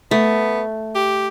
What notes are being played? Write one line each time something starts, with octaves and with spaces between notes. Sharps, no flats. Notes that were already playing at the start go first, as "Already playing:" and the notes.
A3 B3
G4